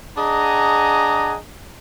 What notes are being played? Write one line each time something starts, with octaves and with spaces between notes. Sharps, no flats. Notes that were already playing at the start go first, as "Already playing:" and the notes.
D4 G#4 D#5 F#5 G#5 A#5